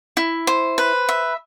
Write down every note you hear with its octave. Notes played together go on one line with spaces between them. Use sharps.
E4
C5
B4
E5